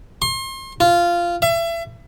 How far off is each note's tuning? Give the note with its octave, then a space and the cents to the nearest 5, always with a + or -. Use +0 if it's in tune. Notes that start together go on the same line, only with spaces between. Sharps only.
C6 +35
F4 -10
E5 +30